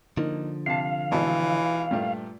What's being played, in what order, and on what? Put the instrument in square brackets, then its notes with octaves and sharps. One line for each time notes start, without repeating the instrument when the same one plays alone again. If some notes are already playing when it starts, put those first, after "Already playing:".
[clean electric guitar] D3 F3 [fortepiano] A#3 D#4
[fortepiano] C3 A5 [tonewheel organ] F5
[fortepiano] G#1 B2 A5 [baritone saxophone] E3
[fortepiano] G2 A#2 A3